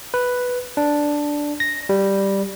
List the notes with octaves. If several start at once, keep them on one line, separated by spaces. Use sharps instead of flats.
B4
D4
A#6
G3